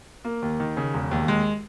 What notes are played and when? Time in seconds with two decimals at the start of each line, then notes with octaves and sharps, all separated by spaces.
0.25 A#3
0.42 D#2
0.60 D#3
0.77 C#3
0.94 E1
1.11 D#2
1.28 G#3